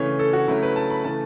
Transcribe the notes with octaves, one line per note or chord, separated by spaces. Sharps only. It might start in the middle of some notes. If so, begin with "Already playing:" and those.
Already playing: C#3 E3 A3 C#5
A4
F#4
C#3 F#3 A3 E4
B4
A5
B5
C#3 E3 A3 A5